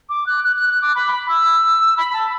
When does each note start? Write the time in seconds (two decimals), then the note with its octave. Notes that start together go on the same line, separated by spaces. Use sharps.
0.09 D6
0.26 F#6
0.44 F#6
0.56 F#6
0.69 F#6
0.82 D6
0.95 B5
1.12 B5
1.29 E6
1.97 B5
2.13 A5